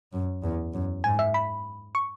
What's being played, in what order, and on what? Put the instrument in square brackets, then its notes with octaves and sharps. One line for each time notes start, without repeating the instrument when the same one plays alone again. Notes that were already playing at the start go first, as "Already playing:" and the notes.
[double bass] F#2
E2
F#2
[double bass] G#2 [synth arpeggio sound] G#5
[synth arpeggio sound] E5
B5
C#6